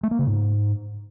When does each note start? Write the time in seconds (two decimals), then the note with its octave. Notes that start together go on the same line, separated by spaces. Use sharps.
0.03 A3
0.11 A#3
0.19 C#3
0.27 G#2